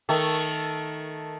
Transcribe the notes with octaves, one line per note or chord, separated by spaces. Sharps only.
D#3 A3